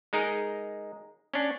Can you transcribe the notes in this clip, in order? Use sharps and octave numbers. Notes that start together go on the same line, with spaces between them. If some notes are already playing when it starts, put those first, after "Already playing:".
G#3 D#4 G#4 A#4
C#4 D4